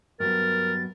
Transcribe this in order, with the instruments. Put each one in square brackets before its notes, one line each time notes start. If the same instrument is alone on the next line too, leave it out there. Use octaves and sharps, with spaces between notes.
[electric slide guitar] G2 F#3 B3 [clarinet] A#4 [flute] A6